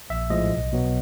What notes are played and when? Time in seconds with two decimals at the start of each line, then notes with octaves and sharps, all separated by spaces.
0.10 A#1 E5
0.30 A2 F3 G#3 D#5
0.50 B1
0.72 B2 F#3 B3